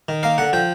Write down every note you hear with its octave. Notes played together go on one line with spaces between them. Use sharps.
D#3
A#3 F5
D3 F#5
F3 G5